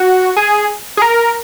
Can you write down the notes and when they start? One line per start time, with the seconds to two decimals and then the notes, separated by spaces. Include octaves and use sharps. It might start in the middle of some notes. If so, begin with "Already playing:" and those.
Already playing: F#4
0.37 G#4
0.97 G#4
1.02 A#4